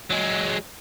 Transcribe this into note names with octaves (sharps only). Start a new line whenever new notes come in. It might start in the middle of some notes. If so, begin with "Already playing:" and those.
F#3 G#3